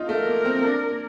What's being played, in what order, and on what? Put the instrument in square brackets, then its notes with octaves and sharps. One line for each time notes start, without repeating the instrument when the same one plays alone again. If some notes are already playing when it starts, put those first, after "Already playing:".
Already playing: [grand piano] D#4 F4
[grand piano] A3 [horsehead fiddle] A#4
[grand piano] A#3
C4
D4
A#3